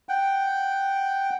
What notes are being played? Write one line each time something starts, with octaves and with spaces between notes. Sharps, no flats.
F#5 G5